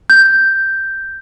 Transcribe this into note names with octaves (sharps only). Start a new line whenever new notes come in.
G6